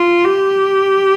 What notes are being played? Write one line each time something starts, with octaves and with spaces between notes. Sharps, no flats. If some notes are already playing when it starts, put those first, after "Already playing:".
Already playing: F4
G4